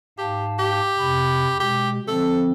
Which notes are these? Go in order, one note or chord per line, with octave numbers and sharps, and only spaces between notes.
G#2 G4 F5 A5
G4
F2 C3 B5
B2 G#3 G4
D3 F3 C4 A4